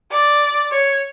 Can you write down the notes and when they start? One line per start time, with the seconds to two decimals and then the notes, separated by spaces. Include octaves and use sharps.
0.12 D5
0.72 C#5